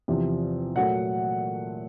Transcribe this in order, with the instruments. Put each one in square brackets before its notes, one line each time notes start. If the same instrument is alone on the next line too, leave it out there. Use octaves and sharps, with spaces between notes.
[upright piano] E2 C3 F3
A#2 F#3 A3 F#5